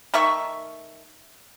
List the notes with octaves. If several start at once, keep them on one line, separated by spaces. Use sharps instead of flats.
D#3 A3 E5 C#6